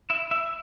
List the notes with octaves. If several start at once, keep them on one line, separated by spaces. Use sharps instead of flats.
E4 E5
E4 E5